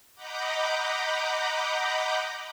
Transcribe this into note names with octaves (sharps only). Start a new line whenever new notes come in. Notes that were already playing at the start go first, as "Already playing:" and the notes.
D#5 F#5 A#5 B5 D6 G6